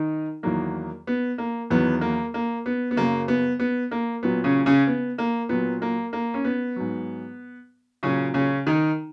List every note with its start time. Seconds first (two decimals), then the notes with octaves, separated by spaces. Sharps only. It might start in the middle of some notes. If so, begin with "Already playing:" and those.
Already playing: D#3 D#4
0.43 E2 D#3 F#3 A#3
1.07 B3
1.38 A#3
1.70 E2 D#3 F#3 B3
2.01 A#3
2.34 A#3
2.66 B3
2.91 B3
2.96 F#2 C#3 F#3 A#3
3.28 B3
3.60 B3
3.91 A#3
4.23 A#2 F#3 B3
4.44 C#3 C#4
4.66 C#3 C#4
4.87 B3
5.18 A#3
5.49 A#2 F#3 B3
5.82 A#3
6.13 A#3
6.34 C#4
6.45 B3
6.76 G#2 F#3
8.03 A#2 C#3 F#3 C#4
8.34 C#3 C#4
8.67 D#3 D#4